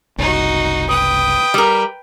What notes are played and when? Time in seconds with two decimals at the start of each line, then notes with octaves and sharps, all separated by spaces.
0.18 F#1 C2 D#4 F#4
0.89 B4 G5 D#6
1.54 G3 A#4